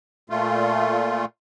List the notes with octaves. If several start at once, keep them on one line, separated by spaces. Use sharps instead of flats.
A#2 A3 F4